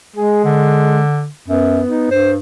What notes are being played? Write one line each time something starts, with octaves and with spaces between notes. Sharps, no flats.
G#3 G#4
D3
F#2 B3
D#4
G2 C5